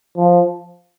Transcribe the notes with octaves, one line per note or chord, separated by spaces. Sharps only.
F3